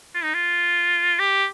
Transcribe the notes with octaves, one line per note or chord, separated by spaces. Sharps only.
F4
D#4
F4
G4